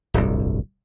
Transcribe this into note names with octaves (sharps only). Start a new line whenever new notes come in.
D1 G1 C2